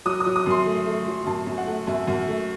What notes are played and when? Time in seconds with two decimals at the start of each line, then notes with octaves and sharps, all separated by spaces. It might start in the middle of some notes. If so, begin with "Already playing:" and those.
0.05 F#3 D#6
0.20 D#6
0.26 F#3
0.36 D#6
0.46 F#2 C6
0.66 A3
0.86 A3
1.07 F#3
1.27 F#2 A5
1.46 F#2
1.58 F#5
1.67 A3
1.87 F#2 E5
2.07 F#2
2.28 A3